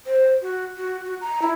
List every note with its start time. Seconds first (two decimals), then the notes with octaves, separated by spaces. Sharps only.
0.06 C5
0.42 F#4
0.77 F#4
1.05 F#4
1.21 A#5
1.42 E4